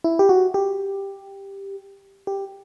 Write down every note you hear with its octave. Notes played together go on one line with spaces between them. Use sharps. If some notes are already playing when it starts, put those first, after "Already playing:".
E4
G4
F#4
G4
G4